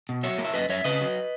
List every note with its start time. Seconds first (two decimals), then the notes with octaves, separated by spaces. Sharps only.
0.09 B2
0.23 F#3 C#5 E5
0.38 A#3
0.45 E5
0.54 F#2 B4 D#5
0.69 F#2 C#5 E5
0.84 C#3 B4 D#5
1.01 F#3